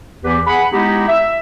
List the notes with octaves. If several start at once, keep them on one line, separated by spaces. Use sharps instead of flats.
E2 E3 G4 B4
G#4 F#5 B5
G#3 B3 D#4 E4 G4
E5